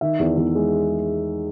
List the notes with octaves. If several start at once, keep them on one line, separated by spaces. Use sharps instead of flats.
D#3 E5
E2
E2
G#3